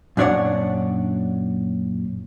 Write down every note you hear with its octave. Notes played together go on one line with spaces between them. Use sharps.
F#2 A#2 D4 C#5 D5 F#5